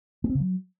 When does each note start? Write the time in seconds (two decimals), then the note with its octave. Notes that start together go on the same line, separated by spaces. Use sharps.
0.24 A#3
0.30 C4
0.35 C#3
0.40 F#3